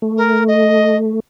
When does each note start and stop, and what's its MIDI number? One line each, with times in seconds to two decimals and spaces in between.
0.02 1.20 57
0.17 0.44 70
0.48 0.96 75